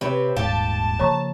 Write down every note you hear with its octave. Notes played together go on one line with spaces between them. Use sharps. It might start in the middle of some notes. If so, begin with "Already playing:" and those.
C3 C4 B4 C#5
D#1 G#2 G4 F5 A5
C#3 F3 A#3 C#5 A#5 C#6